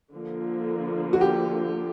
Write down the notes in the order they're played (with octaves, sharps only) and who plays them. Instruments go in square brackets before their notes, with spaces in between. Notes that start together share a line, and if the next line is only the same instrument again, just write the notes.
[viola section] D3 F3 A#3
[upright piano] F#4
G4